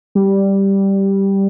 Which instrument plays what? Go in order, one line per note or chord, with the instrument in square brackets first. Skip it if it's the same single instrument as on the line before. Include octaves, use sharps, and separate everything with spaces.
[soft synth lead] G3